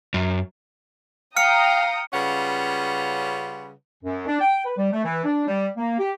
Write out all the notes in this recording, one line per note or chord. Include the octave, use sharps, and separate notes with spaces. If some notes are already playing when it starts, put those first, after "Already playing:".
F#2
F5 G5 A#5 D#6 F6 C#7
C#3 G3 C#4 F4 B4 F#5
F#2
D4
G5
B4
G3
A3
E3
D4
G3
A#3
G4